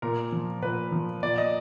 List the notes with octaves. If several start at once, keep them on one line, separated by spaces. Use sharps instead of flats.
A#2 A#4
F3
A#2 B4
F3
A#2 D5
D#5